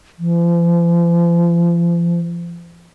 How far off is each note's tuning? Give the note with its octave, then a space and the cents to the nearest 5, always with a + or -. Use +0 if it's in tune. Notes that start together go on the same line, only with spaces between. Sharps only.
F3 -40